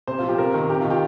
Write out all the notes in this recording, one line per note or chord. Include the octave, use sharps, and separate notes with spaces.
C3 C5
F4
F3
G4
C3 A#4
D#3
C3 G4
D#3 F4
G4